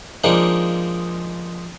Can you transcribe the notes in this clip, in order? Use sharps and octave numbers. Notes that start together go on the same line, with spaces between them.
F3 G#3 A#3 D4 D#4 F4